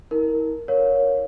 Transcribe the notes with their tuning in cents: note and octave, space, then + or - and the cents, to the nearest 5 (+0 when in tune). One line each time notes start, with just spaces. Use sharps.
E4 -45 A#4 +0
A#4 +5 C#5 +0 F5 +25